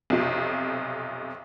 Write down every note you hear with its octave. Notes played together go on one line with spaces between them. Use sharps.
B1 F2 C3